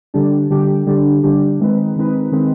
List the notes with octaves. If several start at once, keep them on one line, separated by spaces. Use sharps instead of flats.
D3 G3 D4 G4
D3 G3 D4 G4
D3 G3 D4 G4
D3 G3 D4 G4
D#3 G#3 C4 D#4 B4
D#3 G#3 C4 D#4 B4
D#3 G#3 C4 D#4 B4